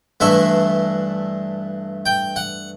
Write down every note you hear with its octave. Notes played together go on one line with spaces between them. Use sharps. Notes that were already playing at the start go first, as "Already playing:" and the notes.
G2 E3 A3 E5
G5
F#5